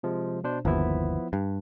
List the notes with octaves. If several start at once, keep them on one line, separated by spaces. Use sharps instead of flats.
C3 F3 G#3
B2 D4 C5
G1 D#2 F3 B3 E4
G2